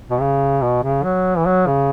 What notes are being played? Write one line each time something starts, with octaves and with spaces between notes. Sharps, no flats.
B2
C#3
B2
C#3
F#3
E3
F#3
C#3